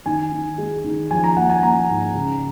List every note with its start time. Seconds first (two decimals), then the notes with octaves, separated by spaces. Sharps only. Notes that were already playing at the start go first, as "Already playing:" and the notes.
0.06 D#3 G#5
0.32 D#3
0.58 G#3
0.84 D#3
1.11 F3 G#5
1.24 A#5
1.37 A#3 F#5
1.50 G#5
1.63 A#3 A#5
1.89 G#2
2.15 C#3